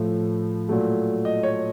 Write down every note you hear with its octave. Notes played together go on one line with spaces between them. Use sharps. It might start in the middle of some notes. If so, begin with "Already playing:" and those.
Already playing: A2 F3 A3
A#2 F#3 A3
D#5
C#5